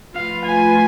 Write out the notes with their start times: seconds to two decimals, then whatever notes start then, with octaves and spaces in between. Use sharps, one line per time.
0.15 F3 A3 F4 B4 F5
0.45 G#5